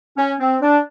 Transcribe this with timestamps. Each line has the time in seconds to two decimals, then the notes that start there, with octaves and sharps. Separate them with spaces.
0.16 C#4
0.39 C4
0.61 D4